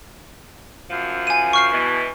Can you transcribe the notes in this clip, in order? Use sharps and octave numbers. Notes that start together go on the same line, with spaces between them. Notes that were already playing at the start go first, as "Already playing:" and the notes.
F#2 F3
G#5 D#7
C#6 F6 C7
B2 E3